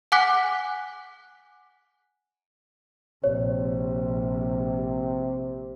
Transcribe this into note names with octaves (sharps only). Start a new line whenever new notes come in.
F#5 G#5 D6 F#6 B6
A#1 C3 C#5